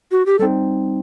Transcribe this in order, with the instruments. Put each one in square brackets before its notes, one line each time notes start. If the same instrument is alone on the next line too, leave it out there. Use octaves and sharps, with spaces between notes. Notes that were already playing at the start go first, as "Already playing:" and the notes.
[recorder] F#4
G4
[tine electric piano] G3 C4 D#4 [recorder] A4